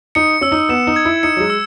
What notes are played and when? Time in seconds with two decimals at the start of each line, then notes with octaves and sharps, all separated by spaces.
0.15 D#4 C#7
0.41 C#4 E6
0.52 D#4
0.69 B3 E7
0.87 D#4
0.96 G#6
1.05 E4
1.23 D#4 C#7
1.37 F#3
1.40 G#3
1.50 E6